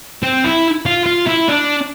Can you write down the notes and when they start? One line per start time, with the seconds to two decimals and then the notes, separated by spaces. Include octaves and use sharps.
0.23 C4
0.44 E4
0.86 F4
1.06 F4
1.28 E4
1.49 D4